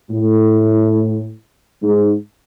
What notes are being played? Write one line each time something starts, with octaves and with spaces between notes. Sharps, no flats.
A2
G#2